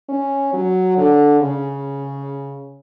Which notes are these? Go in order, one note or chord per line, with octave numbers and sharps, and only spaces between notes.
C#4
F#3
D3
C#3